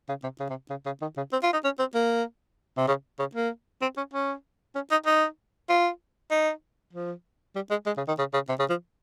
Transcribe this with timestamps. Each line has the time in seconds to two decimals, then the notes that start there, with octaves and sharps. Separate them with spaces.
0.09 C#3
0.23 C3
0.40 C#3
0.50 C3
0.70 C#3
0.86 C#3
1.02 D#3
1.17 C#3
1.32 C4
1.43 F4
1.53 D#4
1.64 C#4
1.79 C4
1.95 A#3
2.78 C3
2.88 C#3
3.19 C#3
3.35 A#3
3.82 C4
3.97 C#4
4.14 C#4
4.75 C#4
4.91 D#4
5.06 D#4
5.69 F4
6.31 D#4
6.93 F3
7.55 G3
7.70 G#3
7.86 G#3
7.97 C#3
8.08 D#3
8.18 C#3
8.34 C#3
8.49 C3
8.59 C#3
8.70 F3